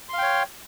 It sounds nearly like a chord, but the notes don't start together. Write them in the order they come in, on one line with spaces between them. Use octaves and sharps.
C6 F5 G5 C#5